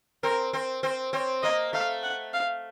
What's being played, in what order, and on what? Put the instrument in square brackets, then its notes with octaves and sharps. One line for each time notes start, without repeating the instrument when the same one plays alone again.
[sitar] C4 [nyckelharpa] A#4
[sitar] C4 [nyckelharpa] C5
[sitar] C4 [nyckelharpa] C5
[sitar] C4 [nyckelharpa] C#5
[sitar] A#3 [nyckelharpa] D#5
[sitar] A3 [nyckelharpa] F5
[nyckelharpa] F#5
F5